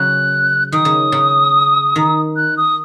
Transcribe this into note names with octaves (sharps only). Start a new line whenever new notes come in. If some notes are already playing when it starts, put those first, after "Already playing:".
Already playing: C#3 F#3 F#6
D#3 D#6
C#3
C#3
D#3
F#6
D#6